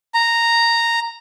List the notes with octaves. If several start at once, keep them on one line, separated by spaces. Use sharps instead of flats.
A#5